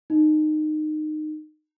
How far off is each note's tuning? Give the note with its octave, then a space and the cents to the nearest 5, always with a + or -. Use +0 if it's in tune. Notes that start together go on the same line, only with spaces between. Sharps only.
D#4 -20